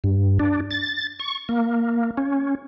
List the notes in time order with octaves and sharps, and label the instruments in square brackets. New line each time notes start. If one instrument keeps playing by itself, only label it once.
[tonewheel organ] G2
D4
A6
C#6
A#3
C#4